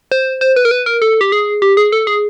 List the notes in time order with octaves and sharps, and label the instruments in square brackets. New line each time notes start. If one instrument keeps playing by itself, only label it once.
[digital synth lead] C5
C5
B4
A#4
B4
A#4
A4
G4
G#4
G4
G#4
A4
G#4